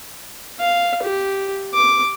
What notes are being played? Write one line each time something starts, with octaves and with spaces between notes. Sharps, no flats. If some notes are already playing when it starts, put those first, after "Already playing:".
F5
G4
D6